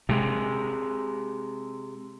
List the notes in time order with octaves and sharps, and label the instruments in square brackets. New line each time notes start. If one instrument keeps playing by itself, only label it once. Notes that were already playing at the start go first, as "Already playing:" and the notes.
[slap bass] C3 G#3